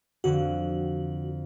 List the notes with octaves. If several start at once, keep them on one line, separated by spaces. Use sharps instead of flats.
F2 D3 F3 F#4